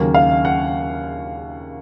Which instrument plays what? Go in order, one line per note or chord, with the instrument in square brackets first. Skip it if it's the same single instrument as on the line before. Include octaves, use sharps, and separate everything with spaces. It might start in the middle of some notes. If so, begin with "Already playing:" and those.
Already playing: [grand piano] D#2 C#3 F#3 A#3 C#4
F5
F#5